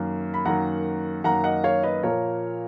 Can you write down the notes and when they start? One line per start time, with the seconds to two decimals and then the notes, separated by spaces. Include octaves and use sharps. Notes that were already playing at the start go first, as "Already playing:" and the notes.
Already playing: F#2 D#3 A#3
0.34 B5
0.45 F#2 D#3 A#3 F#5 A#5
1.24 F#2 D#3 A#3 F#5 A#5
1.44 D#5 F#5
1.64 C#5 F5
1.83 B4 D#5
2.03 A#2 F3 A#3 A#4 C#5